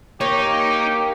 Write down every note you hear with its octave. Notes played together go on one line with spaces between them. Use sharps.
A#3 D#4 G4 C#5